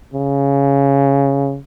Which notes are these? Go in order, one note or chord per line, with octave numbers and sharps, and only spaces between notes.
C#3